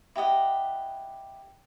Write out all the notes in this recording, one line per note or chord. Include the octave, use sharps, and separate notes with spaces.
E4 G4 D#5 F#5